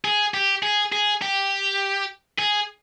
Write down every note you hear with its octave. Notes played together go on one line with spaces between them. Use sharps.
G#4
G4
G#4
G#4
G4
G#4